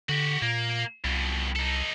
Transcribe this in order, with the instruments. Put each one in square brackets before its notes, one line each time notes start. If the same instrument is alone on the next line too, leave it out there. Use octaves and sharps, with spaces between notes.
[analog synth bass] D3 [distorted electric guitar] F#4 G4
[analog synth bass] A#2 [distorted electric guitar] A#3
[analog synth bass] C2 [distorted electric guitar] F2 B2
[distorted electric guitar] D#4 A4